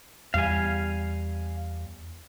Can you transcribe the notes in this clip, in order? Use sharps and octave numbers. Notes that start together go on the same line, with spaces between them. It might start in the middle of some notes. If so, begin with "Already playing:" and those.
E2 G3 F5 G#5